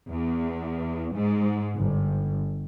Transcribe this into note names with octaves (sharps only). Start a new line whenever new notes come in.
E2
G#2
G1